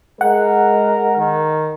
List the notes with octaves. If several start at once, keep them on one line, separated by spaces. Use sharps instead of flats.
G#3 A#4 F#5
D#3